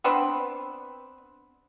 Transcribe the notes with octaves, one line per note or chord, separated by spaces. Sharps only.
B3 C4 D4 B4